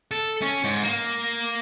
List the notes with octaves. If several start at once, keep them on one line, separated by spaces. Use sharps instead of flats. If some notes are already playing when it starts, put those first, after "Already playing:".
A4
C#4
G#2
A#3